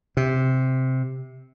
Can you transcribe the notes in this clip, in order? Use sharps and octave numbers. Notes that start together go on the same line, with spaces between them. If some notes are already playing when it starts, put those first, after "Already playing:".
C3